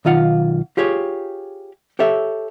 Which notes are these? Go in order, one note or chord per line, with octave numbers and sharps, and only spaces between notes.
B1 D#3 F4 F5 F#5
F4 G4 G#4 C#5
G4 A4 C#5 E5